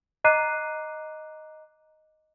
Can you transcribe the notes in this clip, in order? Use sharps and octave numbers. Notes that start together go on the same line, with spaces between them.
D#5 A#5 D6 F#6 C7 D#7